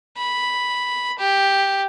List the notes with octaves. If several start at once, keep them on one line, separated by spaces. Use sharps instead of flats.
B5
G4